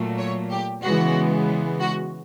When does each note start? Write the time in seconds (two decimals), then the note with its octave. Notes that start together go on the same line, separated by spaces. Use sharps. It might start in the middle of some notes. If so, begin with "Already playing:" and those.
Already playing: A#2 F#3 A3
0.18 C#5
0.51 G4
0.83 C#3 E3 G#3 B3 F#4
1.80 F#4